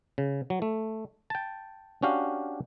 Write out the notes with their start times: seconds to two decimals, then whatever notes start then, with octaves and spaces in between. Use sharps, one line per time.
0.18 C#3
0.50 F#3
0.62 A3
1.30 G5 A5
2.03 C#4 D4 F#4 G4 F5